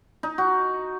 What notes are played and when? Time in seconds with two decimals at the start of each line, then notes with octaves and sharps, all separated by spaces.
0.23 D#4
0.38 F#4